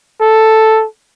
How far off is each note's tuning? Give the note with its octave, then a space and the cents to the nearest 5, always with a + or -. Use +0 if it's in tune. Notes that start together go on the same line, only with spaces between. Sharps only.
A4 +0